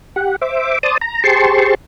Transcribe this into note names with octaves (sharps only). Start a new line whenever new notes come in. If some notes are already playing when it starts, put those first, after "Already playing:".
G4 F#5
C5 E5 D6
C5 D5 A5 D#6
A#5
G4 G#4 C5 A5 C6 C#6